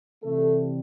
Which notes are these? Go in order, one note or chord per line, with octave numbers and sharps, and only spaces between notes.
C3 E3 G3 A3 A4